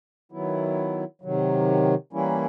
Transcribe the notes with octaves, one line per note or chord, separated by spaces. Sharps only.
D#3 F#3 B3 E4
C3 D#3 F#3
E3 G3 A#3 C#4 E4